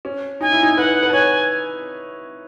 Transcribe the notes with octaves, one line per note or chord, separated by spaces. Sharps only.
C#4
D#4 G#5
E4
D#4
B4 F#5
B4
A5
C#5 G#5